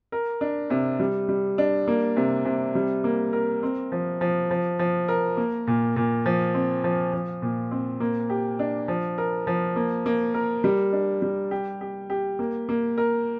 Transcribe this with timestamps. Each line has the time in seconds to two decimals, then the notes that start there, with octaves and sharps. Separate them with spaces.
0.12 A#4
0.41 D4
0.70 C3
1.00 G3
1.29 G3
1.58 D4
1.88 A#3
2.17 C3
2.45 C3
2.75 G3
3.04 A#3
3.33 A#4
3.63 C4
3.92 F3
4.21 F3
4.51 F3
4.79 F3
5.08 A#4
5.37 A#3
5.67 A#2
5.96 A#2
6.26 F3
6.54 C4
6.84 F3
7.13 F3
7.42 A#2
7.71 C4
8.00 A#3
8.30 G4
8.59 D4
8.88 F3
9.18 A#4
9.47 F3
9.76 A#3
10.06 A#3
10.34 A#4
10.64 G3
10.93 D4
11.22 G3
11.51 G4
11.81 G4
12.10 G4
12.39 A#3
12.69 A#3
12.98 A#4